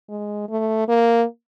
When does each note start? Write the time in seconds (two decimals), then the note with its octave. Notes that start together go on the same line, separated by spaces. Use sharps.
0.10 G#3
0.49 A3
0.88 A#3